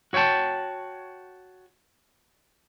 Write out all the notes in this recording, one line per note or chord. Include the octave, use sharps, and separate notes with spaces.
F#4 C#5 F#5 G5 A5